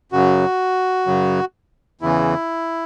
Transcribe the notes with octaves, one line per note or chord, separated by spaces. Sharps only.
F#2 C#3 F#3 F#4
F#2 C#3 F#3
E2 C#3 E3 E4